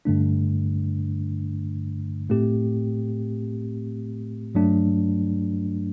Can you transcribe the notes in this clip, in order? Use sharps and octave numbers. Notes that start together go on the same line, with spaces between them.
G2 D3 A3 D4
A2 A3 C4 G4
G2 F#3 A3 D4